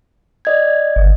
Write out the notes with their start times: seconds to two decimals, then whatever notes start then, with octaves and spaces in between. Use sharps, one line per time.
0.45 D5 D#5 G#6
0.96 G1